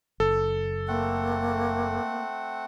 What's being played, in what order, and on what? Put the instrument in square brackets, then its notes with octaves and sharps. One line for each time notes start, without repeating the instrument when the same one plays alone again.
[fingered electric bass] F#1 [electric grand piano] A4
[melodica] A3 C4 F#5 [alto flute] A#3